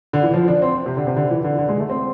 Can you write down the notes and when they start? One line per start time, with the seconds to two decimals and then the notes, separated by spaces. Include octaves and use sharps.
0.13 D3
0.23 E3
0.34 F3
0.48 D4
0.62 C4
0.86 C3
0.97 D3
1.07 C3
1.16 D3
1.31 E3
1.44 D3
1.58 D3
1.69 G#3
1.80 A3
1.89 C4